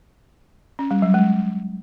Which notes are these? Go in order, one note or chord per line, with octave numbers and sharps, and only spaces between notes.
C#4
G3
F#3
G#3